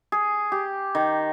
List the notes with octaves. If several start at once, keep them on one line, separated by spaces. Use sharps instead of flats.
G#4
G4
D#3